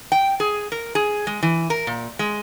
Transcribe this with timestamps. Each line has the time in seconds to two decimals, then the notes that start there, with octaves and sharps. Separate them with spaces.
0.12 G5
0.40 G#4
0.72 A#4
0.95 G#4
1.27 G#3
1.43 E3
1.70 A#4
1.87 A#2
2.19 G#3